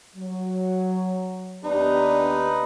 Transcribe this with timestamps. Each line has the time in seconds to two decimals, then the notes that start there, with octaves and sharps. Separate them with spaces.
0.16 F#3
1.64 D#2 B3 D4 D#4 G4 B4